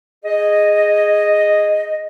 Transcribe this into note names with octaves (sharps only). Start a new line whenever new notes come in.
G#4 D#5